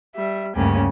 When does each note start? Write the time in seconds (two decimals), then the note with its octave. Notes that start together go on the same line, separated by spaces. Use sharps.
0.16 G3 E5
0.56 D2 G2 C#3 A#3 C#4 G4